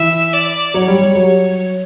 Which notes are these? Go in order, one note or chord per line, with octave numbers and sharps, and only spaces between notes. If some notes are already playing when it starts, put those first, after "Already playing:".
Already playing: E3 E5
D5
F#3 C#5
G3
G3
F#3